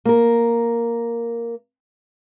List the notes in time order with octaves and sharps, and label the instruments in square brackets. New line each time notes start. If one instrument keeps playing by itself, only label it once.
[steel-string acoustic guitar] A#3 A#4